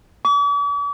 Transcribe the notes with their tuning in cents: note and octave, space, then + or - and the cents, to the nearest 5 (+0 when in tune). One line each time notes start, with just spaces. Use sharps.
D6 -45